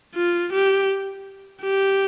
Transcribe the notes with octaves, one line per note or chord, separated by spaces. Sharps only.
F4
G4
G4